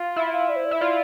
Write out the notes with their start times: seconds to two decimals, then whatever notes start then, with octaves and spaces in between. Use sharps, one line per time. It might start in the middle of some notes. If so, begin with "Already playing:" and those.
Already playing: F4
0.16 E4 E5
0.27 E5
0.33 F5
0.49 D5
0.56 C5
0.65 D5
0.71 E4 E5
0.81 F4 D5